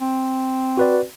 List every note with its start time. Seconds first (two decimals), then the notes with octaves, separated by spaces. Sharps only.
0.01 C4
0.77 F#4 B4 D5